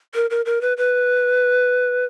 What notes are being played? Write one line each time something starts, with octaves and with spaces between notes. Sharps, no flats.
A#4
A#4
A#4
B4
B4